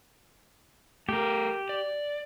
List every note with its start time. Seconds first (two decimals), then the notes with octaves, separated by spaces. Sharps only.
1.09 A3 G4 A#4
1.69 D5